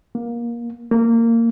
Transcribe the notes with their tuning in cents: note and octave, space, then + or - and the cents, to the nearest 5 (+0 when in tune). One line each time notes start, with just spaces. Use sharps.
A#3 +20
A#3 -20